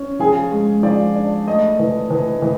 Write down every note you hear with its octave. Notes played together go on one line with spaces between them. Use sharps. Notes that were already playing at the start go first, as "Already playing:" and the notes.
Already playing: C#4
F3 G#4 G#5
G#3
F3 D5
D4
A3 D#5
E3
E3
E3